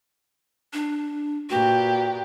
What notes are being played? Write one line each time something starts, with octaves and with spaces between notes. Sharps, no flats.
D4
A#2 F#4 G4 B4